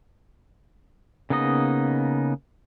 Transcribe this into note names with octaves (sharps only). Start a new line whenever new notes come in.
C#3 A#3 B3 D#4 D#5